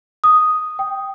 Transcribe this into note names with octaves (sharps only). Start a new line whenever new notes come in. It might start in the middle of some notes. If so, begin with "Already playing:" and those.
D#6
G5